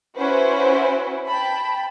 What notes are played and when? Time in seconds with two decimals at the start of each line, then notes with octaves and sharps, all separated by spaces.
0.18 C#4 E4 F#4 B4 C5
1.28 G5 A5 B5